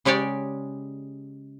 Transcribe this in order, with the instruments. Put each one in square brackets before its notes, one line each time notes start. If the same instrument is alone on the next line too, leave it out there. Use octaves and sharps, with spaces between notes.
[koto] C#3 G#3 G4 C#5 D5